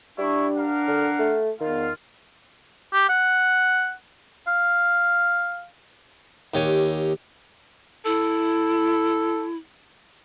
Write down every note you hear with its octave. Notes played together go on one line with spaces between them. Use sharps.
G3 D4 E4 C#6
A#4 F5 F#5
D3
A3
E2 D#3 F4 F5
G4
F#5
F5
D#2 G4 C#5 G#5
E4 A4